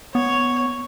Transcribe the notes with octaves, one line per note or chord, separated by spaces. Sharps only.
B3 C#5